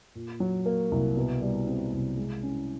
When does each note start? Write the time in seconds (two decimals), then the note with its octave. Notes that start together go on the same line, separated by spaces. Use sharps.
0.15 A#2
0.40 F#3
0.66 A#3
0.91 C2
1.17 B2
1.42 G3
1.67 C4
1.92 C2
2.17 G#3
2.43 C#4